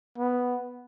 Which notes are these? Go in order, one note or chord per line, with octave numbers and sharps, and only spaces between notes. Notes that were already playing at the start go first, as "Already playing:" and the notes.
B3